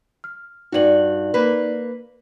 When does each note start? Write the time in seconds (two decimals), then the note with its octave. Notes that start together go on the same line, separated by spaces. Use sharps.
0.24 F6
0.72 G2 D#4 F#4 D5 F#7
1.34 A#3 B4